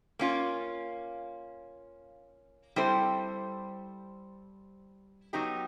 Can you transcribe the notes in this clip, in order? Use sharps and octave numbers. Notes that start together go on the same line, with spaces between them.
A#3 C#4 F4
G3 C4 E4 A4 C5
F#3 B3 D#4 G4